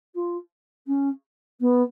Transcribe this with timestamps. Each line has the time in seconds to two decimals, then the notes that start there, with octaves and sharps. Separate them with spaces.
0.15 F4
0.87 C#4
1.60 B3